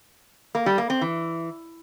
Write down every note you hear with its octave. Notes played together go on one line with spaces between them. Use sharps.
A#3
G3
A#3
C4
E3